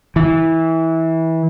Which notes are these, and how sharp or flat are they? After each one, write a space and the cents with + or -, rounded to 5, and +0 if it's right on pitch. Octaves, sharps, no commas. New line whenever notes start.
E3 -20